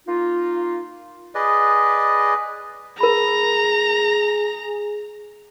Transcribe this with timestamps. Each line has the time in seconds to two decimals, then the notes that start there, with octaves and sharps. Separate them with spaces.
0.07 A#3 D#4 F4
1.35 G#4 B4 D5 D#5
3.00 G#4 A#4 A#5 B5